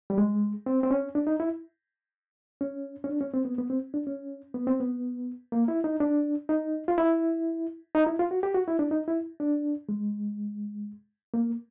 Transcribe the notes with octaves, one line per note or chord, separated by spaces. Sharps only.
G3
G#3
C4
C4
C#4
D4
D#4
E4
C#4
C#4
D4
C#4
C4
B3
B3
C4
D4
C#4
B3
C4
B3
A#3
E4
D#4
D4
D#4
F4
E4
D#4
E4
F4
F#4
G4
F#4
E4
D4
D#4
E4
D4
G#3
A#3